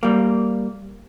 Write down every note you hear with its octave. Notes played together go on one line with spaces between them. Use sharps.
G3 A#3